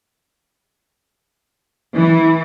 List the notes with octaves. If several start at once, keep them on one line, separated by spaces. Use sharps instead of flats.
E3